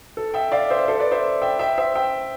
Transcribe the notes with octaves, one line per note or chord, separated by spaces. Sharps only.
A4
E5 G5
D5 F5
C5 E5
A4 C5
B4 D5
C5 E5
E5 G5
E5 G5
C5 E5
E5 G5